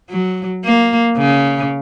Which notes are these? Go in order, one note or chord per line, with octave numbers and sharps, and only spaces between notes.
F#3
A#3
C#3